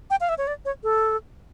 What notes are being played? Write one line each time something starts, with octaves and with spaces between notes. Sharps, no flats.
G5
F5
E5
C#5
D5
C#5
A4